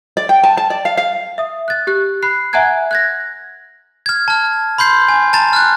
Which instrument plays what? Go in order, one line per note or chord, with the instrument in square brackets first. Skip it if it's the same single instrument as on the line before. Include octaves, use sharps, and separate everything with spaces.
[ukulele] D5
G5
A5
A5
D5
F5
F5
[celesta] E5 D#6
F#6 A6
G4 F#6
B5 F#6 C7
E5 F#5 G#5 A#5 F#6 G#6
F#6 G#6 A#6
[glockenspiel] F6 G#6
A5 F6
B5 C6 G6 C7
G#5
A5 A#5 A6
F6 F#6